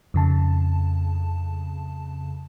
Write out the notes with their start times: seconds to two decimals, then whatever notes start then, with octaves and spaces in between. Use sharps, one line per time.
0.14 F2 C#3 A5